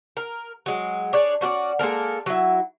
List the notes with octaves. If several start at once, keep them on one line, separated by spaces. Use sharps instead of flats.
A#4
F#3 G#3
D4 G#4 C#5 D5
C#4 F#4 A4 D5
G#3 A#3 A4 A#4
F#3 E4